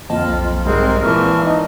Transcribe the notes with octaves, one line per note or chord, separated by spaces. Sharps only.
F2 A#3 F4 D#5 A5
B1
G#1 G3 G#3 C4 A#4
A#2 E3 A5 C#6 F6
D#4